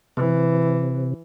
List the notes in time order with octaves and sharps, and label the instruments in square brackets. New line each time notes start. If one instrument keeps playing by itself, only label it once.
[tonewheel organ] C3 [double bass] E3